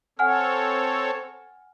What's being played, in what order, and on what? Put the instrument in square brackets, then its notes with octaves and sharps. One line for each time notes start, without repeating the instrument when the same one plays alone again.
[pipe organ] C4 A4 C#5 [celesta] F#5 G#5 F6